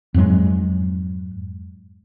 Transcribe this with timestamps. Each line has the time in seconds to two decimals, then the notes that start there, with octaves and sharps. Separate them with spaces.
0.14 F2 G#2 F#3 G#3